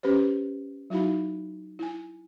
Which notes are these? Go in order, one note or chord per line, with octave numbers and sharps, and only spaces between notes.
C#4 G4 B4 C5
F#3 D#4 E4 F#4 F5 B5
E4 G#5